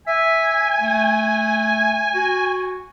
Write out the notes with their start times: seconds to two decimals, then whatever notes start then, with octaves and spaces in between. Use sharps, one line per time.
0.07 E5 G#5
0.81 A3
2.15 F#4